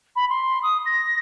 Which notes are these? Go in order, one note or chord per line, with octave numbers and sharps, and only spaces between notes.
B5
C6
D#6
A#6